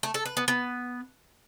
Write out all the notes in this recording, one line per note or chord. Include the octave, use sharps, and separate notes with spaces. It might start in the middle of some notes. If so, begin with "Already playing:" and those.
A3
A4
B4
B3
B3